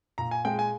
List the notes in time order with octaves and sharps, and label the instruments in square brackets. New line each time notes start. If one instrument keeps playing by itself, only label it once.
[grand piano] A#2 A#5
G#5
G#3 G5
G#5